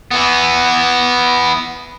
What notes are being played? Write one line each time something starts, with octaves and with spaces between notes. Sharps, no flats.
E3 B3